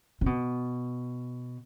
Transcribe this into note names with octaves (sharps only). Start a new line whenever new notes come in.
C#3
B2